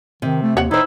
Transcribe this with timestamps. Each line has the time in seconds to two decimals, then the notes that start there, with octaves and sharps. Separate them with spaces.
0.22 C3 D#3
0.42 A3
0.57 D#2 C#5 F#5
0.71 D#3 D#4 E4 C5